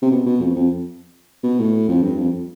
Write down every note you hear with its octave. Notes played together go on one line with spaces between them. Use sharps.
C3
B2
B2
F2
F2
B2
A2
F2
G2
F2